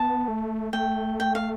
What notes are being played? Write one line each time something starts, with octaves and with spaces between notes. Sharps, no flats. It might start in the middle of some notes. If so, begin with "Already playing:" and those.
Already playing: B3 A5
A3
A3 G5
G5
F5